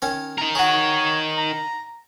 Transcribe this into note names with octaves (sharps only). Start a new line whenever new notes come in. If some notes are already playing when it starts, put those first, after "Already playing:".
D#3 C#4 C#5
D#4 A#4
F#4 G#4 C#5
A#5